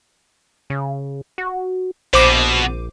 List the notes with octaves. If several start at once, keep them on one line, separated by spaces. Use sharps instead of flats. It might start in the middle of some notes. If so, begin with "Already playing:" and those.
C#3
F#4
A#1 B2 C5 D6